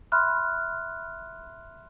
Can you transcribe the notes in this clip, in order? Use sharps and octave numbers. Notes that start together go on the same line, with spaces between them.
E5 B5 C6 F6 F#6